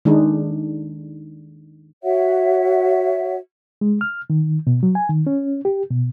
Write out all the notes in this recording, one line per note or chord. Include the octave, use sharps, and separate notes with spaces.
D#3 G#3 D4 D#4
F#4 C#5 E5 F#5
G#3
F6
D#3
B2
F#3
G#5
D#3
C#4
G4
B2